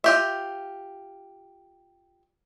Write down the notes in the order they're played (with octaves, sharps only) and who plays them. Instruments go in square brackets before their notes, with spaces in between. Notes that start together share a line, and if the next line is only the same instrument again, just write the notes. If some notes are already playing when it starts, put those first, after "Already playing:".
[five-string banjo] F4 G4 E5